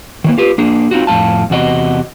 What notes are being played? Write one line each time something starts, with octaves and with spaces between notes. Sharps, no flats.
D#3 E3 A#3
F4 G4 B4
A#3 D4 G#4
C4 D#4 F4 F#4
F2 A2 A#3 F5 A5
E2 C3 F#4 D#5